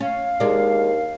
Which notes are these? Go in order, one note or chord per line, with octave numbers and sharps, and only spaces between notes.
C#4 F5
D#2 G#3 D4